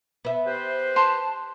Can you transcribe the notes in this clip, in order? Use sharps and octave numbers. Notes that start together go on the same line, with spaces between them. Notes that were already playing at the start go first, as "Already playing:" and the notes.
B3 E5
G4 B4 C5
A5 C6